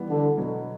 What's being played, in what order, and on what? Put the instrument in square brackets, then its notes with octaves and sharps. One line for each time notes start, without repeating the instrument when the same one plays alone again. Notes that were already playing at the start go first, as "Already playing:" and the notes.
Already playing: [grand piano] E3 G3 B3
[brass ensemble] D3
[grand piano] B2 F#3 B3